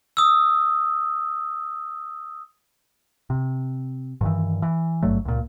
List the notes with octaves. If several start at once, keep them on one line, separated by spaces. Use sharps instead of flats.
D#6 E6
C3
G2 D#3 E3
E3
G#1 G2 F#3 A3
C#2 A#2